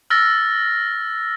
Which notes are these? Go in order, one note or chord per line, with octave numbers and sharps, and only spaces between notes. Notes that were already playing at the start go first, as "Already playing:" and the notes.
E6 F6 A6 A#6